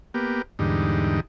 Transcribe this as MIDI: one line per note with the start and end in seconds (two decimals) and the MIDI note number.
0.14 0.42 58
0.14 0.42 59
0.14 0.42 67
0.59 1.20 40
0.59 1.20 44
0.59 1.20 50
0.59 1.20 55
0.59 1.20 63